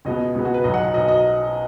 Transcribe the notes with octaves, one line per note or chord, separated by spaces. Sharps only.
C#2 B2 G#3 B3 D#5
C#2 B2 G#3 B3
F#4
B4
B1 B2 F#3 D#5
F#5
F#5
B1 B2 F#3 D#5
D#5